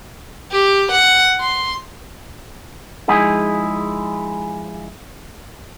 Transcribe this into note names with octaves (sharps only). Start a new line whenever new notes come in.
G4
F#5
C6
F3 G#3 D#4 E4 G#4